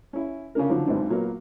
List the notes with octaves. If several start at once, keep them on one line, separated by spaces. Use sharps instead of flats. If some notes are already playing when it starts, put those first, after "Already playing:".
C#4 E4
C#3 C#4 D4 A#4
D3 D#3 F3 F#3
B1 G#2 C4 D4
A#2 F#3 A#3 B3